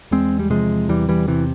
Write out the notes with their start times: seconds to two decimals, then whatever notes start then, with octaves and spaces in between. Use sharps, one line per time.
0.11 E2 G#3 C4
0.39 G3
0.50 C3 F3 G#3
0.88 E2 E3 G3
1.09 E3 G3
1.28 C3 E3